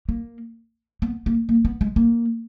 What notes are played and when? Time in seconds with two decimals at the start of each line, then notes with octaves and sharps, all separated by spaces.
0.09 A#3
1.02 B3
1.26 A#3
1.49 A#3
1.65 B3
1.81 G#3
1.96 A#3